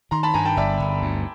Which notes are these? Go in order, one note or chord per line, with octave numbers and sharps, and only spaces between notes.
D#3 A#5 C6
A5 B5
G2 G#5 A#5
G5 A5
G1 D5 E5
G1
D2